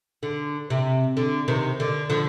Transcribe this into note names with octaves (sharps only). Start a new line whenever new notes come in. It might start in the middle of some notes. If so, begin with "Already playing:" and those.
D3
C3
D3
C3 D#3
D3
D3 F3